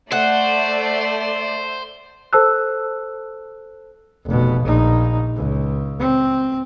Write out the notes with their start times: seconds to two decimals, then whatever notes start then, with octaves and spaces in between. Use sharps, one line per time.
0.12 A3 C5 D5 F#5
2.33 A4 C5 A5 E6 F#6
4.25 F1 B2
4.63 A#1 D#4
5.36 C#2
5.99 C4